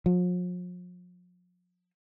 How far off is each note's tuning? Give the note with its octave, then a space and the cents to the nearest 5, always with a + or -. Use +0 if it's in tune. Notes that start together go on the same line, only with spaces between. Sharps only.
F3 +45